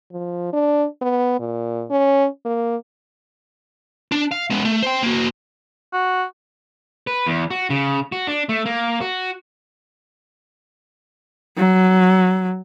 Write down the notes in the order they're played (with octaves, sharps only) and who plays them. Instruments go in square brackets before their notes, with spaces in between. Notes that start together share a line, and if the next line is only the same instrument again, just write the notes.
[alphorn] F3
D4
B3
A#2
C#4
A#3
[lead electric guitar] D4
F5
G#3 B3
A3
C5 G5
A#3 F#4
[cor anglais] F#4
[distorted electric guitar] B4
E2
F#4
C#3
F#4
D4
A3
A#3
F#4
[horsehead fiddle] F#3